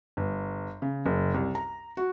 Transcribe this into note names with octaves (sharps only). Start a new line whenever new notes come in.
G1
C#3
F#1
C2
A#5
F#4